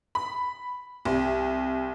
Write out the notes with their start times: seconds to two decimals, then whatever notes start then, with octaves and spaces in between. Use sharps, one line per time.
0.15 B5
1.05 C2